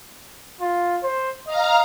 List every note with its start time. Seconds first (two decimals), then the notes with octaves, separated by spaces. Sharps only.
0.61 F4
1.03 C5
1.47 D#5 F5 A#5